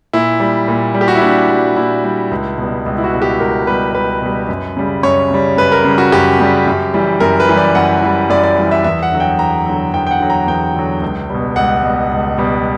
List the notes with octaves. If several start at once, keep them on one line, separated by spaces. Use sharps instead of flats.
A#2 E4
G3
A#2
G3
G4
F#4
E4
A#2 D4
G3
A#2 E4
G3
C#2
B2 G3
C#2
E4
F#4
B2 G3
G4
C#2 A#4
B2 G3 B4
C#2 B4
B2 G3
F#2
C#3 G3
F#2 C#5
C#3 G3
F#2 B4
A#4
C#3 G3
F#4
F#2 G4
C#3 G3
F#2
E3 G3
F#2 A#4
B4
E3 G3
D5
F#2 F#5
E3 G3
F#2 D5
D5
E3 G3
E5
E2 E5
F#5
D3 F#3
G5
E2 A#5
D3 F#3
E2 G5
G5
F#5
D3 F#3
A#5
E2 G5
D3 F#3
C#2
B2 G3
C#2 F#5
B2 G3
C#2
B2 G3